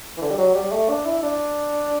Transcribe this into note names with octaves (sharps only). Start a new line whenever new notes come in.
E3
D3
G3
F#3
G3
A3
D4
E4
D4